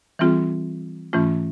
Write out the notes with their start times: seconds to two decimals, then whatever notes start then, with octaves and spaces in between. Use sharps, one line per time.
0.19 E3 G3 C4 F4 G#4
1.13 G#2 E3 A3 C#4 F4